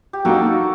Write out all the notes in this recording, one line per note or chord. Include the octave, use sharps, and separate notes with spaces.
G4
F#3 A#3 D#4 F#4 A4